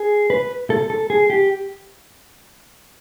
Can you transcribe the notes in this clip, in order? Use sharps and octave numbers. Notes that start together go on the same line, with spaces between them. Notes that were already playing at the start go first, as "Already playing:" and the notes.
Already playing: G#4
B4
A4
A4
G#4
G4